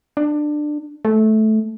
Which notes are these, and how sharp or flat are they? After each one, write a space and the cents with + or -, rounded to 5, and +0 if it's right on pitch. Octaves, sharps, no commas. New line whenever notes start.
D4 +20
A3 -15